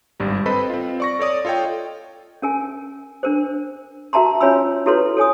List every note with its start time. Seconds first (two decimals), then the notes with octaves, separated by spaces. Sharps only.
0.20 G#1 G2 G3
0.46 C4 A4 B4 C5 D#5 B5
0.70 C4 F4
1.00 D5 C#6 A#6
1.19 A4 C#5 D5 D#6
1.45 F4 A4 C#5 D#5 G5
2.42 C#4 A#4 G#5
3.23 D4 A#4 C5
4.13 F#4 A#4 E5 A5 A#5 C6
4.40 C#4 F4 C#5 G#5 B5 E6
4.86 E4 F#4 A4 B4 C#5 C6
5.17 A4 C#5 G#5 D#6